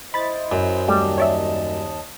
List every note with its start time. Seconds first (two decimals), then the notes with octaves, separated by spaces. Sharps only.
0.14 E4 C5 D#5 B5 A6
0.52 F#2
0.88 D#2 G3 A3 D#5 A5
1.18 C#5 D5 E5